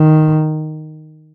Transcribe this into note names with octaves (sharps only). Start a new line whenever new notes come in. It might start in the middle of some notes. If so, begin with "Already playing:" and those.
Already playing: D#3